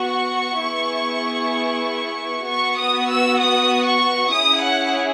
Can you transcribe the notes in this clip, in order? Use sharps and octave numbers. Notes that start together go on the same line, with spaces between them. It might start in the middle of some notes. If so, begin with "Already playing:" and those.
Already playing: B3 F#4 C#6
B3 E4 G#4
B3 F#4 C#6
D#6
E6
D#6
C#6
C#4 E4 G#4 D#6
F#5